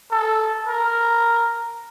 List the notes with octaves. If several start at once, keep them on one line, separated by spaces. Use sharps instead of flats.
A4
A#4